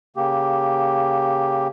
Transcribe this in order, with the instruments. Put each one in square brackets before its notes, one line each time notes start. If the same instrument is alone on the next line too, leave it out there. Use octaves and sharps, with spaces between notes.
[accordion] C#3 A#3 G4